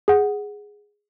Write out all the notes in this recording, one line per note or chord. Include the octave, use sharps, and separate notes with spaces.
G#4 F#5